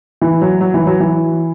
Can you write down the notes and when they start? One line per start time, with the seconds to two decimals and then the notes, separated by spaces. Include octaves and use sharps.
0.22 E3
0.42 F#3
0.61 F#3
0.74 E3
0.87 F#3
1.00 E3